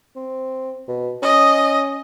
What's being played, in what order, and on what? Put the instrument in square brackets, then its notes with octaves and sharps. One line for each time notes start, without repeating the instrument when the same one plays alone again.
[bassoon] C4
B2
[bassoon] C#4 [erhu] D#5